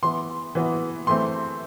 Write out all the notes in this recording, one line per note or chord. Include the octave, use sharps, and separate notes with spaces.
E3 B3 C6
E3 B3
E3 A3 C4 C6